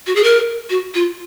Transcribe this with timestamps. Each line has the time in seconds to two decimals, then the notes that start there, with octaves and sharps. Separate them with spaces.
0.07 F#4
0.16 G#4
0.24 A#4
0.70 F#4
0.94 F4